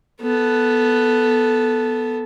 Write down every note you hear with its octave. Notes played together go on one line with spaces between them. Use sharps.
B3 A4